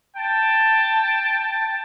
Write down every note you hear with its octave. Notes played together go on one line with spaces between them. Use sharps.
G5 A5